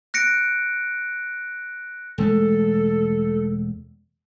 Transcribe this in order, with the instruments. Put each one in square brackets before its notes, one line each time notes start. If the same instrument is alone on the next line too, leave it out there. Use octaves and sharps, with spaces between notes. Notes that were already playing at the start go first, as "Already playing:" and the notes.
[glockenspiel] F#6 A#6 C#7 D7
[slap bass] E1 G#3 A3 [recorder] A4